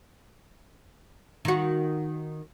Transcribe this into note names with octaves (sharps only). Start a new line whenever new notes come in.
D#3 F#4